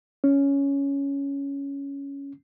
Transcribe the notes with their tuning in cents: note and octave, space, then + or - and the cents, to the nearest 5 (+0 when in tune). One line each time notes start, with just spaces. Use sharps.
C#4 +10